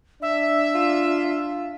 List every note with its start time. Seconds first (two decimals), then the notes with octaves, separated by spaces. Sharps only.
0.22 D4 E5
0.75 F4